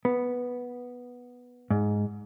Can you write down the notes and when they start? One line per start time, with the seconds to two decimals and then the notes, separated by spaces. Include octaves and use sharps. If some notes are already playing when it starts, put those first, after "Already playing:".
0.05 B3
1.70 G#2